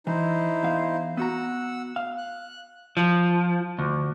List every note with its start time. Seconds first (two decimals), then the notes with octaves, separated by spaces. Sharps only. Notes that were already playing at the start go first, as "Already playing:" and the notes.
0.07 E3 D#4 E4 C5
0.63 E2 F5
1.17 B3 F#4 F#5 A#5 E6
1.96 F5
2.18 F#6
2.97 F3
3.79 D2